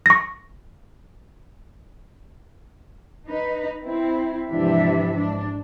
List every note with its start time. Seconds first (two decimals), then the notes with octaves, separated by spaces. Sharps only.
0.06 C#6 A#6
3.28 D#4 B4
3.83 C4 E4
4.49 G#2 C3 E3 F3 D4 E5
5.15 G#2 D4